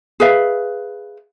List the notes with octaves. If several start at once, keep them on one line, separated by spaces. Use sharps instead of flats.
G#4 B4 E5 F5